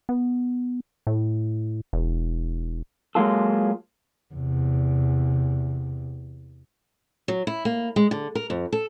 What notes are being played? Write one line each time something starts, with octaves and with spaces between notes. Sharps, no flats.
B3
A2
E1
F#3 G#3 A#3 F4 A4
E2 C3
F#3
E4
A#3
G#3
D3
A#4
F2
A4